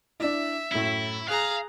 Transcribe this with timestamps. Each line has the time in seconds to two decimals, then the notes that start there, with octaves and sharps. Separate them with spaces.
0.20 D4 E4 E5
0.72 F#2 A2 E4
1.28 G#4 F5 A#5 F#6